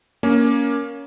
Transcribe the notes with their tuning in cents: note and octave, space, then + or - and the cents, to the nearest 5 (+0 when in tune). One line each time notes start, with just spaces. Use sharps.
A#3 +10 C#4 +20